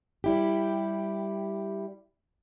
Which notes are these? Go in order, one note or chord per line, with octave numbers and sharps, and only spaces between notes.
G3 E4 G4